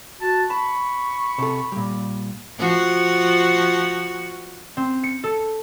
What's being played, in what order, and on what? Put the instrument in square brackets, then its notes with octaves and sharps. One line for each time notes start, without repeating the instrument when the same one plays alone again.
[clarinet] F#4 [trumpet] A5
[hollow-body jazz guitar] A5 [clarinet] B5 [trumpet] C#6
[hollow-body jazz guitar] C3 A4
A#2 G3
[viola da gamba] F3 F#4
[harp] C4
C#7
A4